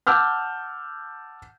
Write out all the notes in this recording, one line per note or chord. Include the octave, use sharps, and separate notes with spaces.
F#5 A5 D6 E6 F6 G6